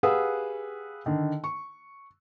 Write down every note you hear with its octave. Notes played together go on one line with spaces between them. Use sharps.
G4 G#4 B4 F5 F#5 E6
D3 D#3
C#6